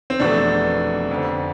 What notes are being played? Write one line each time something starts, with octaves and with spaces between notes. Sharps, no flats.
C4
F1 E2 B2 A3 D4
F1 F2 D3